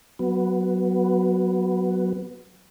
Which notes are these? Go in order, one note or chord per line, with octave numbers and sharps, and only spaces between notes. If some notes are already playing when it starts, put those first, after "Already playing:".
F#3 B3